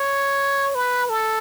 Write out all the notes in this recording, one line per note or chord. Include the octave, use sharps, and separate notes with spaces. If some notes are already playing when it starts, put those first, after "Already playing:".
Already playing: C#5
B4
A4